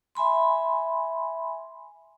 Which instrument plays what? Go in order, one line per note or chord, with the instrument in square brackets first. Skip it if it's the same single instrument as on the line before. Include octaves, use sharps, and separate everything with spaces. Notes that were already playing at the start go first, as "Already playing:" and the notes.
[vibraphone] E5 G#5 B5 C6